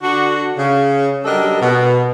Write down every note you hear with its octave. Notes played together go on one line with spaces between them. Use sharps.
D3 D4 F#4
C#3
F#3 G3 D4 A4 A#4 D#5
B2